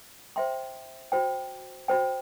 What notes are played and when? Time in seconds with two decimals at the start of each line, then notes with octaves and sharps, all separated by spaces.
0.36 C5 E5 G5 C6
1.12 F#4 C5 G5
1.88 F#4 C5 G5